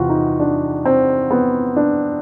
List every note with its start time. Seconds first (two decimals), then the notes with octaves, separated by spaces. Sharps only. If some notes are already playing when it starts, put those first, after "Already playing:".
Already playing: E2 C3 E3 F4 F#4
0.10 D#4
0.40 D4
0.86 C4
1.31 B3
1.76 D4